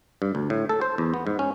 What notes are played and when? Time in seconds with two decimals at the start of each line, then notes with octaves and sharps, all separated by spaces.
0.22 G2
0.35 D2
0.50 A2
0.69 A4
0.81 C5
0.98 E2
1.14 B3
1.27 G#2
1.39 C#4